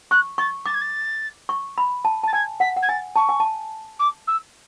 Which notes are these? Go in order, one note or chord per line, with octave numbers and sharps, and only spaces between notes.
C#6 F#6
C#6 A6
D6 A6
G#6
A6
C#6
B5
A5
A5 A6
G#5 G#6
F#5 B6
F#5
G#6
G#5 A6
A5 C#6
G#5
A5
D6
E6